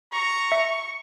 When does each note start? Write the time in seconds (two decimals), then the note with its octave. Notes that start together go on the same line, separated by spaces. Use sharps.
0.12 A#5 C#6
0.52 E5